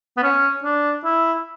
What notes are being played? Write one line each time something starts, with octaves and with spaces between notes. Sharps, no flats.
B3
C#4
D4
E4